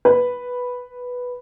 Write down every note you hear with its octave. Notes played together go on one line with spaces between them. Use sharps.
B4